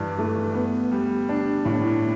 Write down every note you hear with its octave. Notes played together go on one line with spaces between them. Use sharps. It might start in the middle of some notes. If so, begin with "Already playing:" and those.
Already playing: G2 E3 D4
A3
B3
G3
D4
A2